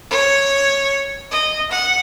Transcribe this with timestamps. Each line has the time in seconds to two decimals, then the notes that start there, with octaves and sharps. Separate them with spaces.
0.11 C#5
1.31 D#5
1.71 F#5